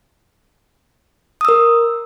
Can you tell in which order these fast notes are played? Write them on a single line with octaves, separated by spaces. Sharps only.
D#6 E6 A#4